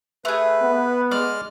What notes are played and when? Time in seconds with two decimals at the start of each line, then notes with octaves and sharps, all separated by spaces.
0.25 A3 G#4 B4
0.62 B3
1.11 G#3 D5 F6